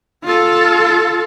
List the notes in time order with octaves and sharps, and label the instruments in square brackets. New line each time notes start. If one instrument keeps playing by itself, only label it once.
[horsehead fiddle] F4 A4